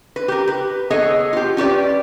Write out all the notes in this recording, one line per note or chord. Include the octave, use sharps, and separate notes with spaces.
B4
G4 A#4
B4
B3 G#4 A4 C#5 D#5
F4 G4
C#4 G4 B4 D5